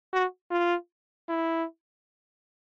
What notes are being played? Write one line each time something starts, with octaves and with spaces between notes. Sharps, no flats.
F#4
F4
E4